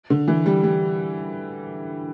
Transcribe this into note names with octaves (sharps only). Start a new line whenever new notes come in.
D3
E3
G3
G3